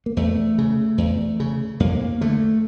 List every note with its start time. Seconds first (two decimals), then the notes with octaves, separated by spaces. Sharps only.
0.06 A#3
0.17 E2 A3
0.58 C#3
0.98 E2
1.40 C#3
1.80 F2 A#3
2.21 D3 A3